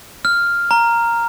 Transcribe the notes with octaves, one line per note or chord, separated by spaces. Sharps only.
F6
A#5